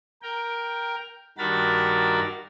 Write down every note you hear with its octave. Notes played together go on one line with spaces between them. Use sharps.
A#4 G5
G2 D#3 F#4 A#4 B5 A6